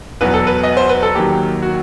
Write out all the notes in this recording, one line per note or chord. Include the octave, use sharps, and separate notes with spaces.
E2 B2 F#3 B4
A4
B4
D#5
C5
B4
A4
D#2 D#3 F#3 G4
F#4